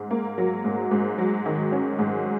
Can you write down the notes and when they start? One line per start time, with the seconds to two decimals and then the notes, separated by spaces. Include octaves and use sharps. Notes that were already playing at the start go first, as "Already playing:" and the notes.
Already playing: G#2
0.11 A#3
0.38 F#3
0.64 G#2
0.91 G#2
1.18 F#3
1.46 D#3
1.72 C#4
1.99 G#2